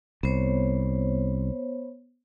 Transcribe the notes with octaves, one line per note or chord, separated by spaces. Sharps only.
C2 B3 C5 C#5